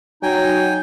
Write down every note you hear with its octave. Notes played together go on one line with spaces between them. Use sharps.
F#3 D#4 G5 G#5